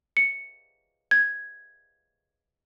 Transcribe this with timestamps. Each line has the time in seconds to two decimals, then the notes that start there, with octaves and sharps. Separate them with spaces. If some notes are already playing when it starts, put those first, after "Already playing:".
0.17 C#7
1.11 G#6